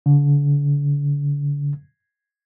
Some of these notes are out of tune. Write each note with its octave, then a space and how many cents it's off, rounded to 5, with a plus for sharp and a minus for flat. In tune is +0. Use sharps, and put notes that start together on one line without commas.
D3 -35